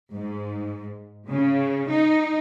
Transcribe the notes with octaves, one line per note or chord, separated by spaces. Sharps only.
G#2
C#3
D#4